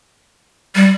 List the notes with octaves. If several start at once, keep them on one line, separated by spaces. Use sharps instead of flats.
G3